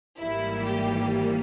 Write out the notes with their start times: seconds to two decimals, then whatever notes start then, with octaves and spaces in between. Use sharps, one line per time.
0.19 G#1 G#2 E3 G3 A#3 E4
0.66 G4